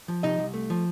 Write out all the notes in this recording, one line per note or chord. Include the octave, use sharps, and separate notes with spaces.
F3
C3 D#4 D#5
C2
A3
F3